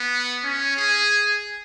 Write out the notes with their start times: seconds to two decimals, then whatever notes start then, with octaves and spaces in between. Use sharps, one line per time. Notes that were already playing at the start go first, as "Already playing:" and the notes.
Already playing: B3
0.44 C#4
0.77 G#4